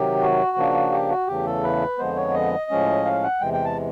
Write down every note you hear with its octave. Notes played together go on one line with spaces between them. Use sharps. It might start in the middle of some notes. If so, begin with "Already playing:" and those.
Already playing: C3 D#3 F#3 G4
F#4
C#3 F3 A#3 D4
G4
F#4
E2 C#3 E3 A3 G4
A4
B4
F2 D3 F3 G#3 B3 C5
C#5
D#5
A2 F3 G#3 C#4
F5
F#5
E2 C3 E3 G#3 G5
G5
A5